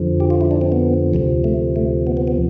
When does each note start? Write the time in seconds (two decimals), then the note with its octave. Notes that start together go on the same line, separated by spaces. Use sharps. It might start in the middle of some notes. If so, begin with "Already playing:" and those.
Already playing: F2 D3 F3
0.20 G4
0.30 F4
0.41 E4
0.51 D4
0.61 C4
0.72 B3
1.14 D2 C3 F3
1.44 A3
1.76 A3
2.07 B3
2.17 B3
2.28 B3